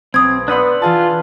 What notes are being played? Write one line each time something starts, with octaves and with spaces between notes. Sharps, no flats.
B1 C4 D#6 G#6
B3 D4 B4 F#5 C6 E6 G6
E3 F4 G#4 A5